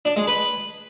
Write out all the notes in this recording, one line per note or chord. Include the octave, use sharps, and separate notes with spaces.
D4
G#3
B4